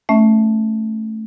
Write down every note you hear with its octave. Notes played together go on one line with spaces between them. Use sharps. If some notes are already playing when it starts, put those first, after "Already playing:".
A3 C#4 E5